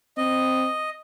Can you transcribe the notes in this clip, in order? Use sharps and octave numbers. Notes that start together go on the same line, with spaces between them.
C4 D#5